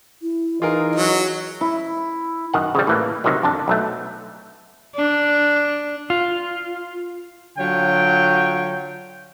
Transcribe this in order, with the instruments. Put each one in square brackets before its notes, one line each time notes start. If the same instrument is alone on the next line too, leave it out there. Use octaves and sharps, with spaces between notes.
[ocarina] E4
[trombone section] E3 D#4 [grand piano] F4 G#4 A#4 [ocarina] D#5
[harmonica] F#3
[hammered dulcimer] E4
[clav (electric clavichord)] F#2 D#3 F#5
C#3 F3 G3
A2 E3 A#3
C3 D#3 E3 F#3
F2 D3 D4 A5
B1 F#3 A3
[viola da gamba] D4
[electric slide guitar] F4
[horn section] D3 F#3 F4 C#5 G5